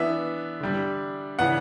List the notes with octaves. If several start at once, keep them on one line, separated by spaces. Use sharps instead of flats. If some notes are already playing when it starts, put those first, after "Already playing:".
Already playing: E3 B3 D4 E5
D3 G3 D4
C#3 E3 B3 D4 F#5